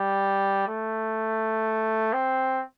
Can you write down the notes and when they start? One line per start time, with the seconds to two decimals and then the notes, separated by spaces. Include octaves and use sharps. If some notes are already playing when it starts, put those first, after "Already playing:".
Already playing: G3
0.68 A3
2.13 C4